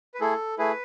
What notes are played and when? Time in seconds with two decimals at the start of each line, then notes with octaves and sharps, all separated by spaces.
0.14 B4
0.20 A3 E4 G#4 A4
0.58 A3 E4 G#4 B4